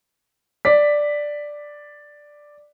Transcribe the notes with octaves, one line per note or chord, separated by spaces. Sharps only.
D5 B6